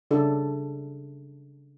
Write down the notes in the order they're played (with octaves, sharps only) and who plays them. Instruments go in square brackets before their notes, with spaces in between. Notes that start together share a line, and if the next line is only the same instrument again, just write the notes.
[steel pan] C#3 D4 A4